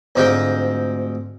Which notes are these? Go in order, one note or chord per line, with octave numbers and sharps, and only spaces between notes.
D2 G#2 C4 F4 G4 G5